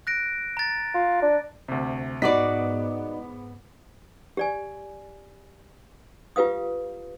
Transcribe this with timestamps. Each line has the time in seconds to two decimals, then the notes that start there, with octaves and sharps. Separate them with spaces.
0.07 F#6 A#6 D7
0.57 A#5 A6
0.94 F4
1.22 D4
1.68 D2 C3
2.22 G#2 B3 D#4 F#4 D5 B5 D6 B6
4.37 G4 D5 G#5
6.36 F4 G4 B4 F5 D#6